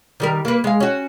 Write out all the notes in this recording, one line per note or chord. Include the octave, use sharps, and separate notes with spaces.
D#3 G3 A#4
A#3 B4
G#3 F5
C#4 F#4